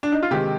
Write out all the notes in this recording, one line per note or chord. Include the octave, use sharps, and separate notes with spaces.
D4
D#4
F4
C3 D#3 G#3 G4